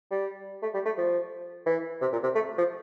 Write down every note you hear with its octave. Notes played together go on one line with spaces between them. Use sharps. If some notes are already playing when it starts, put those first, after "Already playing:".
G3
A3
G3
A3
F3
E3
C3
A#2
C3
A3
F3